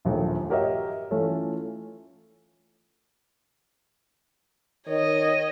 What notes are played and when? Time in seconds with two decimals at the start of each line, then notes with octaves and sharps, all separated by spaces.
0.05 A#1 D#2 F3 A3
0.49 F#4 G4 A#4 C#5 D#5 E5
1.11 E3 A3 C#4 F4 A4
4.88 D#3 C#5 D#5